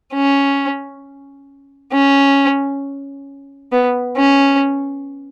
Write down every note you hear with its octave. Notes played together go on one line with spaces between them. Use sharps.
C#4
C#4
B3
C#4